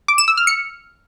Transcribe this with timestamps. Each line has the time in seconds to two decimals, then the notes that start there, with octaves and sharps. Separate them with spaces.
0.08 D6
0.18 E7
0.28 E6
0.37 F6
0.47 C#7